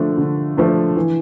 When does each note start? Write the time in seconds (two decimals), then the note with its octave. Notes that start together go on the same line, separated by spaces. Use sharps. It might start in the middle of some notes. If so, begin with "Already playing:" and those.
Already playing: D3 F3 A3 D4
0.18 D3
0.57 F3 A3 D4
0.96 E3